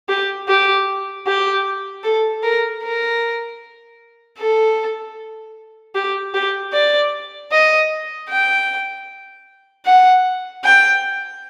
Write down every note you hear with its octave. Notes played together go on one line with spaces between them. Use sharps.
G4
G4
G4
A4
A#4
A#4
A4
G4
G4
D5
D#5
G5
F#5
G5